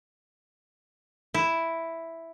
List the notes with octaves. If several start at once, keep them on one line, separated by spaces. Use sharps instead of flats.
E4